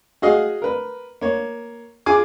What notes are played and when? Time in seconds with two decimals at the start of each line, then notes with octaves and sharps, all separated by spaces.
0.22 F#4 G#4 D#5 F5
0.62 A#4 B4
1.21 A#3 C#5
2.06 F4 G#4 G#5 D6